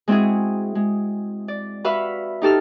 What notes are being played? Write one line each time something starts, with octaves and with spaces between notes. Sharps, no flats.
G#3 C4 E4 F#4 G#4
G#3
D5
F#4 B4 E5 F5 B5 E6
D#4 G4 A4 F6